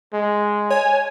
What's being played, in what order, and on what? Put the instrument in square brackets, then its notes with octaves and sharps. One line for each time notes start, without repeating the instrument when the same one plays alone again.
[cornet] G#3
[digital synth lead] C#5 [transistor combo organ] G#5